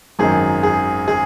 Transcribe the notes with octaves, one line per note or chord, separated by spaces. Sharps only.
G#1 F#2 D#3 G#4
G#4
G#4